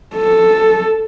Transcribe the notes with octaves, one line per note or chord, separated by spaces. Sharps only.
A4